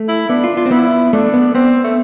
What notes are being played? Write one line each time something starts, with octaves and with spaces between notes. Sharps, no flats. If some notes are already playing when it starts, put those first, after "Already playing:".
Already playing: A3
E4
B3 D4
F4
F4
C4
B3 E4
A3 D4
B3
B3 C4
A3